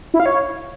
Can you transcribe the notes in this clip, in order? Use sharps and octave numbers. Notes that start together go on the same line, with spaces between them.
E4
F5
C#5